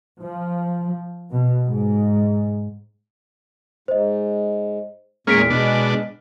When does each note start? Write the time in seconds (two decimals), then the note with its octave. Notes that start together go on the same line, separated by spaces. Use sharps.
0.18 F3
1.31 B2
1.67 G#2
3.88 G#2 C5 D#5
5.27 E2 A#2 G#3 A#3 C#4 F6 B6 D7
5.50 B2 G#3 D4